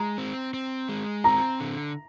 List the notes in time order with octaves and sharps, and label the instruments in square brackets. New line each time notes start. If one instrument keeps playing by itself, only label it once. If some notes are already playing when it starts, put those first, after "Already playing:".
Already playing: [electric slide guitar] G#3 [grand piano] A#5
[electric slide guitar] C4
C4
G#3
[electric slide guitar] C4 [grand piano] A#5
[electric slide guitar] D3